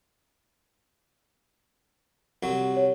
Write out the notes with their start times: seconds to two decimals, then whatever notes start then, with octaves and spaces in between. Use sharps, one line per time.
2.43 C2 F#3
2.77 C#5